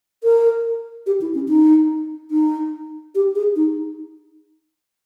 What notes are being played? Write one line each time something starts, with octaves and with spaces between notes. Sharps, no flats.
A#4
G4
E4
C#4
D#4
D#4
G4
G#4
D#4